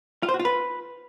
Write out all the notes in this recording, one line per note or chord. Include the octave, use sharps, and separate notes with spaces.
F4
C5
F#4
F4
B4